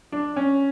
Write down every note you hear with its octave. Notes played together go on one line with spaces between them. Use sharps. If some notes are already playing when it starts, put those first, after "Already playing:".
D4
C#4